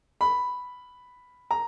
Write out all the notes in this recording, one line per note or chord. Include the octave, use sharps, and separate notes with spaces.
B5
A#5